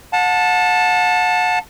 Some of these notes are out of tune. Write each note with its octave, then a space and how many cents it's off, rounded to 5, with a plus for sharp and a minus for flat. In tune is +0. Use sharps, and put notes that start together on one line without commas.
F#5 -35 A5 +0